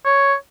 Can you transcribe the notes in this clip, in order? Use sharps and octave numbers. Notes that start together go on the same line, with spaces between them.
C#5